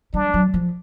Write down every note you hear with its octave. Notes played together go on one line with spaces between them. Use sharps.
G3 D4
F#3
F3